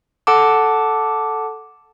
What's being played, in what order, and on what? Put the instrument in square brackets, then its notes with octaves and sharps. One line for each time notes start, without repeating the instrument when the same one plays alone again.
[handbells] A4 F#5 A5 D6